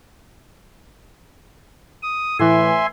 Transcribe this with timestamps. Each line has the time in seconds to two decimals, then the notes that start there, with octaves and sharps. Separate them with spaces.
2.03 D#6
2.39 A2 E3 E5 G#5 C6